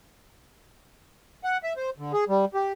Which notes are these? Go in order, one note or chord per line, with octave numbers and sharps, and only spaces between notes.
F#5
E5
C5
D3
G#4
G3
G4